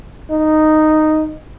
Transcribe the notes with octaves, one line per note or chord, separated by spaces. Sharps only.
D#4